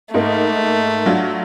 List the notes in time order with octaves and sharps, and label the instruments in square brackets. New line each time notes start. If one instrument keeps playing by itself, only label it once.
[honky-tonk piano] G#2 A#3 D#4 [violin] A3
[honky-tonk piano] F#3 D4 F4